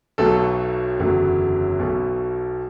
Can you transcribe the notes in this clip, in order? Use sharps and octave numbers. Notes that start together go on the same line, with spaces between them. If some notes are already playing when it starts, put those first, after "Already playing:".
B1 B2 F#3 A3 A4
F#1 E2 D3 F#3 A3
B1 B2 A3